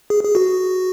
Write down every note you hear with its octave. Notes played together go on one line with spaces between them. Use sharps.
G#4
G#4
F#4